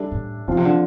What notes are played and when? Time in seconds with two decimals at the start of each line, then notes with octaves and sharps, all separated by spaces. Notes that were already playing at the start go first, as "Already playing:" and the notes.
Already playing: G3 D4 A4 E5
0.11 A2
0.47 A#2 F3 C4 F4
0.57 C3
0.65 D3